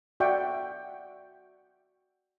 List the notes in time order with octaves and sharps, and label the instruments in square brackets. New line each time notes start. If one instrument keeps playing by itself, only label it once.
[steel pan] F#4 D5 E5 F#5 G5 C#6